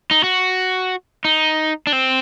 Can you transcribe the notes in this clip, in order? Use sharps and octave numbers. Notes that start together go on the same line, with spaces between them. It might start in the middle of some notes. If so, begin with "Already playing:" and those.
D#4
F#4
D#4
D4
C4